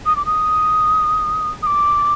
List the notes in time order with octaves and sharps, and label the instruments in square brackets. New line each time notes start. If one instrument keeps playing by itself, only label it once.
[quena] D#6
D6
D#6
D#6
D6